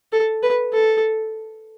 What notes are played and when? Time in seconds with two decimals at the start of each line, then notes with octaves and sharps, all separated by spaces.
0.12 A4
0.43 B4
0.73 A4